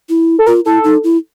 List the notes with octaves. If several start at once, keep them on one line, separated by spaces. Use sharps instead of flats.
E4
A4
F4 A#4
E4 A4
D#4
E4